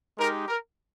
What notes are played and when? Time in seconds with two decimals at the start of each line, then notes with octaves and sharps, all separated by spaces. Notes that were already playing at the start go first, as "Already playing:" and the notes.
0.17 G#3 D#4 G4 A#4
0.47 A#4